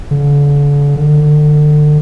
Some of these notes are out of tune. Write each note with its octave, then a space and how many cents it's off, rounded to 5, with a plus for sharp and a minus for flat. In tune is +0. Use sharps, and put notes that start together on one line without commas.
D3 -40
D3 +30